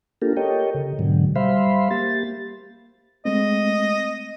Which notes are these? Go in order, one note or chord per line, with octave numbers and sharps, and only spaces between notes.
A#3 D4 F4 G4 A4 A#4
G4 A4 A#4 C#5 D#5 G5
C#3
G#2 B2 D3 F#3
G3 C5 E5 F5 B5 C6
A#3 G4 A6
G#3 A3 C4 D#5